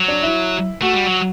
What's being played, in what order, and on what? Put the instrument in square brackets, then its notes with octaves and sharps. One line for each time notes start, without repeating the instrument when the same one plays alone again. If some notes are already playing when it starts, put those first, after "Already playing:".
Already playing: [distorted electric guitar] F#3
[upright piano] D4
E4
[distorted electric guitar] A3 [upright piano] F#4
[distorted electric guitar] G3
F#3